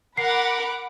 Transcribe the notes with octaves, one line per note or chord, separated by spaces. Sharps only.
A#4 F#5 B5 D6 C7